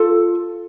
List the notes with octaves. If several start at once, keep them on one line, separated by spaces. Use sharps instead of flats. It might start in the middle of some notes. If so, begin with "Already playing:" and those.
Already playing: F4 A4